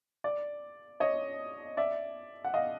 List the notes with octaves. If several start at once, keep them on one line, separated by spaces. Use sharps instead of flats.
D5
C#5 D#5
D5 E5
F#5
D#5 F5